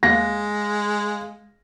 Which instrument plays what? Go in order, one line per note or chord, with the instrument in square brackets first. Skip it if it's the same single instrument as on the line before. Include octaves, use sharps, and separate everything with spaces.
[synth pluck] D#2 A#3 F#6 [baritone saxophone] G#3 [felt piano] F5 A#6